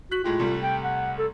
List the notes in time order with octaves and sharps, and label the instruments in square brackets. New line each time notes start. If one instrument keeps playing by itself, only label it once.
[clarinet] F#4 [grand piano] F#6 B6 F#7
[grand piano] A2 G#3 G4 [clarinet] F4
[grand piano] C2 G3 A3
[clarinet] G5
F#5
A4